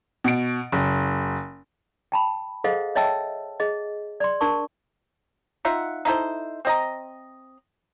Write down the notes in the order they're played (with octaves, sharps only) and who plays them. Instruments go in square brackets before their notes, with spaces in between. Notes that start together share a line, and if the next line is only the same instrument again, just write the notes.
[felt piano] B2 D7
F#1
[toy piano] G5 A5 B5
G#4 A4 C5 D#5 F5 F#5
C#5 D#5 E5 G5 A5 E6
G#4 D#5
D5 C6
D4 A#4 A5 C#6
[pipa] D#4 F4 E5 F#5
D#4 E4 A4 C5
C4 D#5 A#5